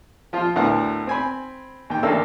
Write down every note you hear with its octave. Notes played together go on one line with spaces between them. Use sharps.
F3 F4
D2 A2 B3 A#4 F#5
C4 G#5 B5
D#2 G5
A1 D2 A#3 A4 E6